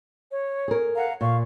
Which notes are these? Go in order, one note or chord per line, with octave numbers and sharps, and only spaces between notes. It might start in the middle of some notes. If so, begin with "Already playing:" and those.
C#5
G#4 A#4
F5 F#5 A#5
A#2 F5 C#6